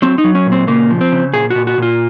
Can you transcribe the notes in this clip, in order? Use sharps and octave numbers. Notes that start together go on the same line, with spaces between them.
F#3 C4
D#4
F#3
C#4
A#2
C4
C#3 A#3
F3
C4
C#3
A#2 G#4
A#2 F#4
F#4
A#2 F4